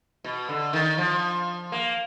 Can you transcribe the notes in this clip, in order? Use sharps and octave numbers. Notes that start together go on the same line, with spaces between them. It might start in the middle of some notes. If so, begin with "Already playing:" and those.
B2
D3
D#3
F3
A#3